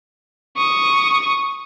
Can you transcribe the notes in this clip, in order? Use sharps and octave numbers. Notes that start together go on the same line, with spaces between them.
C#6 D#6